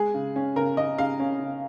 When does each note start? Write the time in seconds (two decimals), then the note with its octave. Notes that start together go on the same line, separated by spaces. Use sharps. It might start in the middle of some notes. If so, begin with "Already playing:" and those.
Already playing: G#3 G#4
0.14 C#3
0.36 C#4
0.56 C#3 A#4
0.77 C#3 D#5
0.98 C#3 F5
1.20 C#4
1.40 C#3